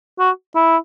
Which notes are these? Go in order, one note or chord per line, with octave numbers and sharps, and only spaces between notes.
F#4
E4